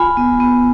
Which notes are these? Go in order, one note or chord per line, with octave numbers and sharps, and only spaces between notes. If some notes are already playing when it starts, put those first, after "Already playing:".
Already playing: F4 G#5 B5
B3
B3